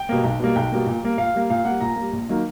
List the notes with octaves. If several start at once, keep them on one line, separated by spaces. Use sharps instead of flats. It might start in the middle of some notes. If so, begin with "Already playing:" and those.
Already playing: G5
B2 G3 A#3
B1
B2 G3 A#3
B1 G5
B2 G3 A#3
A#2
G3 A#3
A#2 F5
G3 A#3
A#2 F5
G3 A#3 F#5
A#2 A#5
G3 A#3
A#1
D#3 F#3 A#3